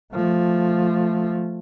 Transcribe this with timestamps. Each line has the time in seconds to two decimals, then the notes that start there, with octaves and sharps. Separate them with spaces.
0.13 F3 A3